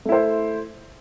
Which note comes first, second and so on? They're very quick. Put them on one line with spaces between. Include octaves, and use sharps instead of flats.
A3 E4 C5